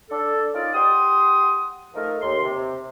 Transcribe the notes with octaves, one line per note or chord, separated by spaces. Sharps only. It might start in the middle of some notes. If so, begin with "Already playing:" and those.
D4 A4
C#4 D#4 F4 A#4 D5
G4 F#5 C6 D#6
F3 A3 D#4 A#4
D#2 C6
C3